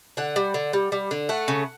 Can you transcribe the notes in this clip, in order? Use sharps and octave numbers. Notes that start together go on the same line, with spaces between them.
D3 F#5
G3
D3
G3
G3
D3
A3 F#5
C#3